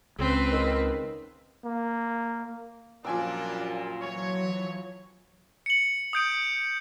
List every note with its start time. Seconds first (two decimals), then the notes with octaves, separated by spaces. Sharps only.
0.19 C#2 C4 B4
0.53 D#3
1.65 A#3
3.05 F#2 A#2 F3 G3 A#3 D4 G#5 E6
4.01 E3 F#3 C#5
5.66 C#7 F#7
6.13 D#6 G6 D7